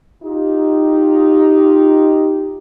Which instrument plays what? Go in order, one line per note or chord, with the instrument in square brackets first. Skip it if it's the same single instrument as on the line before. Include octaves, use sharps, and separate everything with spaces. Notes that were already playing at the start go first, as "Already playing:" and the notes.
[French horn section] D#4 F4 G4